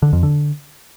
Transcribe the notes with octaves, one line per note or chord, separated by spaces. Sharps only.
D3
F2
D3